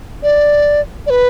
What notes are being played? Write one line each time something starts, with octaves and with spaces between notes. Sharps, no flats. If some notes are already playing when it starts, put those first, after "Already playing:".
D5
D5
B4